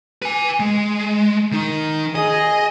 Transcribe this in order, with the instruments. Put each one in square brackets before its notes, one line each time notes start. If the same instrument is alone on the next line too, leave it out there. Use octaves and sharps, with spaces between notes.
[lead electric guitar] B4 G#5
G#3
D#3 D#4
[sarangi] G#4 [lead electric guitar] D#5